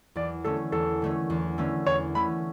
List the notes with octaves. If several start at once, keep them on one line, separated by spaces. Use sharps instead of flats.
E2 D5
D3 A3 C#4 A4
E2 A4
D3 A3 C#4
E2
D3 A3 C#4
E2 C#5
D3 A3 C#4 B5